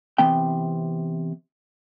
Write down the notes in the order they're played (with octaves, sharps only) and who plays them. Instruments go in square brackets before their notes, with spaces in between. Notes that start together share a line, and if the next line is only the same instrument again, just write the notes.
[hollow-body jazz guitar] C3 E3 B3 G5